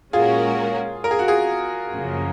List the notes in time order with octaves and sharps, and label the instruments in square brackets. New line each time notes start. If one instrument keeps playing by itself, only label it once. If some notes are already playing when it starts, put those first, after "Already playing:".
[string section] A#2 G#3 C#4 F#4 A#4 [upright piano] F4 G#4
[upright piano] A#4
G#4
F#4
F4 G#4
[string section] F#2 C#3 F3 A#3